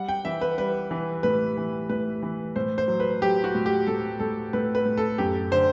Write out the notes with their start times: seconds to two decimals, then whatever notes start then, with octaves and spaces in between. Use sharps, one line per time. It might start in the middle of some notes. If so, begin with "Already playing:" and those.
Already playing: G3 F#5
0.09 G5
0.25 E3 E5
0.41 B4
0.58 G3 B4
0.91 E3
1.23 A2 B4
1.57 E3
1.89 A2 B4
2.22 E3
2.56 A2 C5
2.78 C5
2.88 F#3
3.00 B4
3.22 F#3 G4
3.44 F#4
3.55 A2
3.66 G4
3.87 A2 A4
4.20 A2 A4
4.53 A2 B4
4.75 B4
4.85 A2
4.97 A4
5.18 F#2 G4
5.51 D3 C5